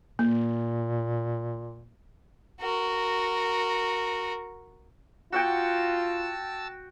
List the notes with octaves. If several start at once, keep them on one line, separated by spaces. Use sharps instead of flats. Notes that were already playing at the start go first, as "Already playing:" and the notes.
A#2 A#3
F#4 A#4
F4 F#4 F#5 G5 A5 E6